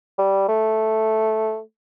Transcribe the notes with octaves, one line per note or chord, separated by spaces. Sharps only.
G3
A3